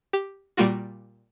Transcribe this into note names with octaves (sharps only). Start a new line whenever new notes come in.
G4
A#2 G3 A#3 F4 F#4